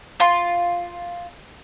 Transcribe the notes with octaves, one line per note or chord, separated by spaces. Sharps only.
F4 C6